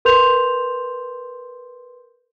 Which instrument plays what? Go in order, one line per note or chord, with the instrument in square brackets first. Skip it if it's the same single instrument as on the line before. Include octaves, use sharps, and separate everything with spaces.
[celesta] A#4 B4 C6 G6 F7